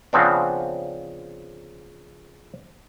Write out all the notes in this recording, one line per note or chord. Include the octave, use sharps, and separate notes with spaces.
C#3 F3 B3 C4 D4